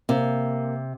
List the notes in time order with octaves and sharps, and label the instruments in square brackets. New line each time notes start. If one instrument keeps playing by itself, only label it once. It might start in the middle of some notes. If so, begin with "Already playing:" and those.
[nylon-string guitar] C3 [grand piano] A#3